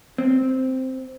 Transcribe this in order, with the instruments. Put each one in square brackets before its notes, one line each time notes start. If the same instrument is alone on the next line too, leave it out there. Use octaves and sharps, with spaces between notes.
[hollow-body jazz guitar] C4